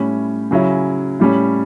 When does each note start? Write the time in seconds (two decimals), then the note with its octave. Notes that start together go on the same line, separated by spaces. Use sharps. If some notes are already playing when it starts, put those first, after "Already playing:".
Already playing: A2 G3 C#4 E4
0.51 C#3 F#3 C#4 E4
1.20 A2 G3 C#4